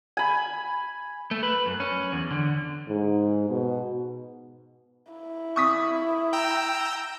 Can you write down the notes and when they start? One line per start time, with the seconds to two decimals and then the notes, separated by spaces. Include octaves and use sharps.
0.17 G#5 B5
1.31 A3
1.43 B4
1.66 F#2
1.80 C#4
2.12 E2
2.30 D3
2.88 G#2
3.50 B2
5.13 E4
5.56 C#6 D#6 B6
6.33 G5 A#5 E6